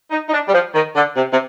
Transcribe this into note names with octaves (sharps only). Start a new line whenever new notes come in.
D#4
D#4
D4
G3
F3
D#3
D3
C3
C3